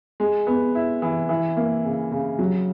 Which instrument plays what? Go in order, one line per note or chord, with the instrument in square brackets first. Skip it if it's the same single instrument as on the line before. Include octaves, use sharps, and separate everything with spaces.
[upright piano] G#3
B3
E4
E3
E3
A#3
C#3
C#3
F#3